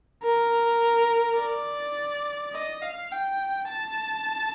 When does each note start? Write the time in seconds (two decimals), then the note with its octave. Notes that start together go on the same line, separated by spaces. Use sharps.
0.24 A#4
1.39 D5
2.54 D#5
2.83 F5
3.12 G5
3.69 A5